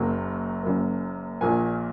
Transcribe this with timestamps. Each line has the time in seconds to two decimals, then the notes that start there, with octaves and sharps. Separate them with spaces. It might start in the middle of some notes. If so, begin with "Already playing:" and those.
Already playing: F#1 F#2 F#3 A#3
0.63 F#1 F#2 F#3 A#3
1.41 A#1 A#2 A#3 G#5